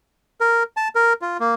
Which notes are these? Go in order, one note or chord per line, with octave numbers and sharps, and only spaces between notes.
A#4
A5
A#4
F4
A#3